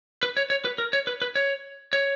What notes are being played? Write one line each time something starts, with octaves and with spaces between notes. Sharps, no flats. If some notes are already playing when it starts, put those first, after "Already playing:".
B4
C#5
C#5
B4
A#4
C#5
B4
B4
C#5
C#5